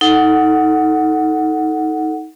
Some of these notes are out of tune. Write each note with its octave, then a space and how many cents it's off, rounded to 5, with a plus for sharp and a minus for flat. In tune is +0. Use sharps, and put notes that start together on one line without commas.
D#4 +20 A4 +0 F#5 +0